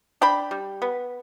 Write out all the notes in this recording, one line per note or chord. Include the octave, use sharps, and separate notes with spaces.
D4 G5 B5
G3
B3